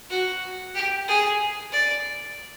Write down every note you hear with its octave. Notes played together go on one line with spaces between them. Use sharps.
F#4
G4
G#4
D5